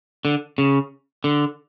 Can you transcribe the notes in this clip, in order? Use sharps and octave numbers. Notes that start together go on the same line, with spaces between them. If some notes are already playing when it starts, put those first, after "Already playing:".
D3
C#3
D3